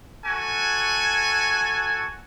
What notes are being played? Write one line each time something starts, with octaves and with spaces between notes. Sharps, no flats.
F#4 A4 G#5